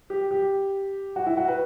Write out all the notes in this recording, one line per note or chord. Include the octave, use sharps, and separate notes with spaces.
G4
G4
F#4
E4
F#4
B4